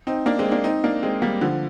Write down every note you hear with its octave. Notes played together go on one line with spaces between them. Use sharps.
C4 D#4
A#3 D4
G#3 C4
A#3 D4
C4 D#4
A#3 D4
G#3 C4
G3 A#3
D3 F3